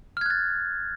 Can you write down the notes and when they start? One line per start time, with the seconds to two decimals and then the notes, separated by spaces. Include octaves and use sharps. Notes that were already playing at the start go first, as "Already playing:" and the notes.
0.17 F6
0.21 G#6
0.26 F#6
0.30 A6